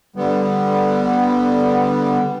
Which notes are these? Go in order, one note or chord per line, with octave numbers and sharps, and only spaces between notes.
D3 G3 B3